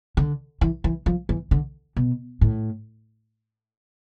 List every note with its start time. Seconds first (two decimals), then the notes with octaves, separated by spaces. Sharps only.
0.17 D3
0.61 E3
0.84 E3
1.06 F3
1.29 E3
1.51 D3
1.97 B2
2.41 A2